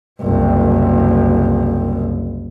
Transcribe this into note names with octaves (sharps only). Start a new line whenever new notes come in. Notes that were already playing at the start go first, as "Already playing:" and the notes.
F#1 C2